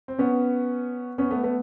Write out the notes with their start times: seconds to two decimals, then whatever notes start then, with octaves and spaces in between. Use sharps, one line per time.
0.08 C4
0.18 B3 C#4
1.18 B3 C#4
1.31 A3 B3
1.43 A3 B3